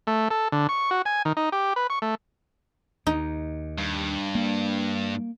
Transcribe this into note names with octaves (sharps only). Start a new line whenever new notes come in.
A3
A4
D3
C#6
F#4
G#5
D#3
D#4
G4
B4
C#6
A3
D#2 D#4
G2
A#3